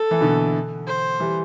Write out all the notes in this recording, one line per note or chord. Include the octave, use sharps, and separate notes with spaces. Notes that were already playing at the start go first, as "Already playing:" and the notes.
Already playing: A4
E3
B2 D3
C5
E3 G3